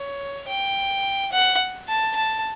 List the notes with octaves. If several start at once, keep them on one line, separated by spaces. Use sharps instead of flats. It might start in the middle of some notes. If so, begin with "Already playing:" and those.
Already playing: C#5
G5
F#5
A5
A5